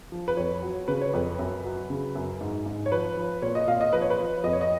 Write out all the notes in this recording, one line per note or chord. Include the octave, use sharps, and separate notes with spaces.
F3
B4
F2 C#5
F#3
C#3 B4
C#5
F2 B4
F#2
F#3
C#3
F#2
G#2
G#2
C#5
F3 B4
F3
A#2 C#5
D#5
A#2 F5
D#5
F3 B4
C#5
B4
F3
F2 D#5
C#5
D#5